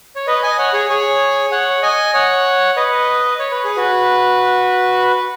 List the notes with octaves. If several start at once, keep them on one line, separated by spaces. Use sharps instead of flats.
C#5
B4 D#5
D#5 G#5
C#5 F#5
G#4 C#5
G#4 C#5
C#5 F#5
D#5 G#5
C#5 F#5
B4 D#5
C#5
B4
G#4
F#4 B4